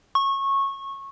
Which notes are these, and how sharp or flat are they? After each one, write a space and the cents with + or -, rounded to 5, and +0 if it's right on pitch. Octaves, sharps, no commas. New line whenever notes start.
C#6 -20